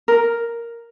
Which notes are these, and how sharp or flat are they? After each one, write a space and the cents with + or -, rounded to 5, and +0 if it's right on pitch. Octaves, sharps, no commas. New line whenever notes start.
A#4 +0